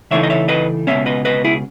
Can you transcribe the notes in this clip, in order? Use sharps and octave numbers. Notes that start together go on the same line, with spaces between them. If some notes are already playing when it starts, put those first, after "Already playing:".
C#3 E3 A3 D#4 C#5 E5
D#5
C#5 E5
B4 D#5
C#2 B2 A3 C#4 C#5 E5
B4 D#5
B4 D#5
E4 G#4